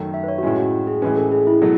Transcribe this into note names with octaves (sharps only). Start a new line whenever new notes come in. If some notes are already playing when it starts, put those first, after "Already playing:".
Already playing: F#2 D#3 A3
E5
B4
C#5
F#4
A2 G#3 C#4 E4
F#4
G#4
A2 E3 G#3 C#4 B4
A4
G#4
E4
B2 F#3 A3